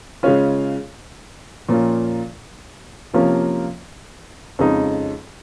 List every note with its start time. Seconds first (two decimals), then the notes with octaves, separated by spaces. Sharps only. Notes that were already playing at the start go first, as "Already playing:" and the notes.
0.23 C#3 G#3 C#4 F4
1.69 A#2 F3 A#3 C#4 F4
3.14 C3 F3 A#3 C#4 F4
4.59 F2 C#3 G#3 D#4